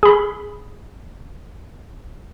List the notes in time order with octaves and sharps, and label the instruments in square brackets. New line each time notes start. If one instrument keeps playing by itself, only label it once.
[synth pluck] G#4 B5